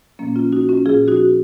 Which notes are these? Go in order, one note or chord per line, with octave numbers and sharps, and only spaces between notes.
A#2 F3 A#3 C#4
C#4 F4
D#4 F#4
C#4 F4
A#2 F3 F4 G#4
D#4 F#4